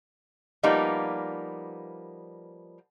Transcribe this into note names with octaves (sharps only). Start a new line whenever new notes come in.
F3 G3 A#3 B3 D#4